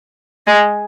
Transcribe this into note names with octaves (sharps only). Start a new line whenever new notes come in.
G#3